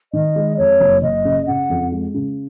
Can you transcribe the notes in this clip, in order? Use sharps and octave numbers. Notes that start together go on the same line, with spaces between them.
D#3 D#5
G#3
F2 C#5
F#1
F#1 D#5
C#3
C#3 F#5
F2
G#3
C#3